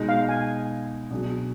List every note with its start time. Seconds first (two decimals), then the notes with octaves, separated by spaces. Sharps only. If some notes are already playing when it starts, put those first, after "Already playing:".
Already playing: B2 G#3 D#4
0.09 F5
0.29 G#5
1.10 B2 F#3 D4 G#4